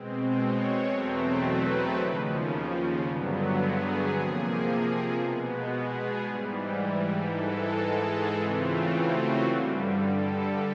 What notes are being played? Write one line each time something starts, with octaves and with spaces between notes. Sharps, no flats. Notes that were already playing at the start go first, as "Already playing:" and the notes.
Already playing: B2 G#3 C4
C#5
E2 B2 F#3 A3 C4
B4
D#2 C#3 F3
G2 D3 F#3 B3
G#4
C3 F3 A#3
B2 G#3 B3
G#4
G#2 E3 G3
G#2 E3 G#3 A4
G#4
C#3 E3 A3 C4 F4
F#4
G2 D3 G3
A4